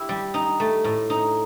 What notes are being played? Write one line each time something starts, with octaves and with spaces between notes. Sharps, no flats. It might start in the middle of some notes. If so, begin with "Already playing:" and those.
Already playing: E4 G4
G3
D#4
A3
A2
D#4